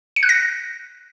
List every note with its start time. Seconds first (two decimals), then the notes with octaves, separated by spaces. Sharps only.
0.16 C#7
0.23 F#6
0.29 A#6